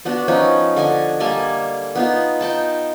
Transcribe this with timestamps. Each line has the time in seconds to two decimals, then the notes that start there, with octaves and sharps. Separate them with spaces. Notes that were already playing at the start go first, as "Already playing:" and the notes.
0.05 B3 D4 F#4
0.28 F3 C#4 D#4
0.76 D3 D#5 G#5 C#6
1.20 G3 A#3 G#5 A5
1.95 B3 D#4 F4
2.41 D#4 G5 A5